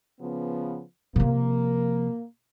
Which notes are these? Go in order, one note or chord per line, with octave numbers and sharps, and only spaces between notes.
C#3 F3 B3
C3 F3 A#3